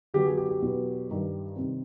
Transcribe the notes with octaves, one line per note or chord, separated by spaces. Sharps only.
D3 F#3 B3 G4
G#4
G4
G4
E2 B2 F#3 B3
G2 D#3 G3
C3 D#3 G3 C4